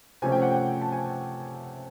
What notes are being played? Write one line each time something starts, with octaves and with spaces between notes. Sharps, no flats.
C3 F3 A3 C#4 G#5
G5
F#5
G5
A5
G#5